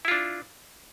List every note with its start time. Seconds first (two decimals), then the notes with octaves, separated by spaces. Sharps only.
0.05 E4
0.08 F4
0.11 D4